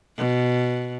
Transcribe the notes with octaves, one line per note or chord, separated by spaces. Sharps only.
B2